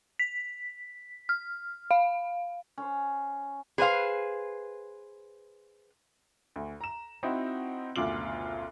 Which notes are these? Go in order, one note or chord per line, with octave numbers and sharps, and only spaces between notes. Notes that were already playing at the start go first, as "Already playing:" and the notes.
B6
F6
F5
C#4 C5
G#4 B4 C5 F5
D2
A#5 E7
C4 D#4 E4 F#4
F#1 D2 B2 F4 D6 F#7